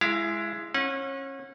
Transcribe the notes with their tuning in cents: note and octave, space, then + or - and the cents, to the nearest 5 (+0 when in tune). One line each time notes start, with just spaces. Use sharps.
G#3 +0 E4 +20 F5 -15
C#4 -30 F#5 -30